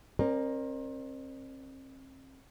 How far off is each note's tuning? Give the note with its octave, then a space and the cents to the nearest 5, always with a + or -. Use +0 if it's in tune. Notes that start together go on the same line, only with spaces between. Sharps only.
C4 +40 A#4 +0 D5 +40